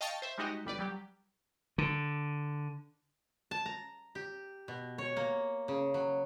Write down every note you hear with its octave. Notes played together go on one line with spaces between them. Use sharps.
D#5 F5 G5 A5 C#6 A6
C5 E5
G3 G#3 D#4 F#4 G4 D#5
G1 G3 B4 D5
F#3 G3 G4
D3
A5
A#5
G4
B2
C#5
A#3
C#3
F#3